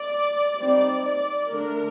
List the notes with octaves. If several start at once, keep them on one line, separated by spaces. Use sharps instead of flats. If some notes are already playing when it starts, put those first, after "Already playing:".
Already playing: D5
G3 C4 D#4 D5
D5
D3 A3 D4 A#4